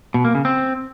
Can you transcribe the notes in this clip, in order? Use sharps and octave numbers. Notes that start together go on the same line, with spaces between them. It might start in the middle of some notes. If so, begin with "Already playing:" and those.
B2
A#3
C#3
C4